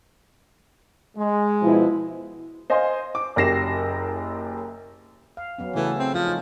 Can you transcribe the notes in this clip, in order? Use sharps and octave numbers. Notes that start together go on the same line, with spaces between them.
G#3
B2 F3 E4
C5 D#5 F5 G#5 C6
D6
F#1 F#2 G4 A#6 C7 E7
F5
F#3 B3 C#4
C#3 E3 A3 A4
C4
F3 C#4
D#4